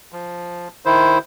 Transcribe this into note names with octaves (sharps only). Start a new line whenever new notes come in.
F3
D#3 E4 C5